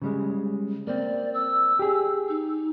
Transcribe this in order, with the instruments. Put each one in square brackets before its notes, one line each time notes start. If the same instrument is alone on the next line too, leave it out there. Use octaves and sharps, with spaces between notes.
[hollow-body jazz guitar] C#3 G3 G#3
[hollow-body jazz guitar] A#3 C4 [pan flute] D5
[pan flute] E6
[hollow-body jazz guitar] G4 G#4
[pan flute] D#4